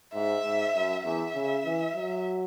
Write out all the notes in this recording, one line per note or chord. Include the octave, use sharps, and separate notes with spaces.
G#2 E5
G#2
F#2
E2 E5
C#3
E3
F#3